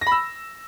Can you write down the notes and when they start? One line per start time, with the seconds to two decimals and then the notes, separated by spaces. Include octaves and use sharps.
0.01 A#6
0.07 B5
0.12 E6